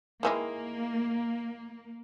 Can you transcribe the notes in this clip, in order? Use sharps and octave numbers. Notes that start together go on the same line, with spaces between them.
D#3 E3 G#3 A#3